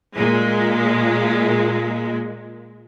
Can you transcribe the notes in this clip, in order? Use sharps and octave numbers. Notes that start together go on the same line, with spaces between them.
A#2 G#3